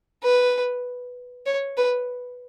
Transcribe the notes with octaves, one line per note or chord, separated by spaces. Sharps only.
B4
C#5
B4